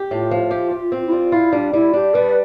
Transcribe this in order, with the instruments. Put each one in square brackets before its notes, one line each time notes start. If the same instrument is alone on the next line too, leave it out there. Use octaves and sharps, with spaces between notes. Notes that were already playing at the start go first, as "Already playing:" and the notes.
Already playing: [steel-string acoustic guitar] G4
[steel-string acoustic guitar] A2 [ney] F4
[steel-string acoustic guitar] F3
G4
G4
C4
[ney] E4
[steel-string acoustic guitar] G3 [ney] F4
[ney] E4 [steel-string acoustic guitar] F4
[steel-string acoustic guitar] G3 [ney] D4
[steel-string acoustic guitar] G3 [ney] E4
[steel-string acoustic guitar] D4 [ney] G4
[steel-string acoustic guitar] G3 [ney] B4